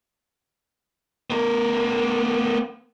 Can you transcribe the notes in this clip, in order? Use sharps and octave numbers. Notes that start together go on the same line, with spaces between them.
B3 A#4